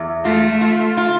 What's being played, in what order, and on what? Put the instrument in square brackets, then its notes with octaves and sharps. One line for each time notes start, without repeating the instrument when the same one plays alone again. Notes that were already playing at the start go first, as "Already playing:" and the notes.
Already playing: [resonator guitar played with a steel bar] E2
[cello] A3 [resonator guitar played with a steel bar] F4
[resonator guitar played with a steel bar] F4
F4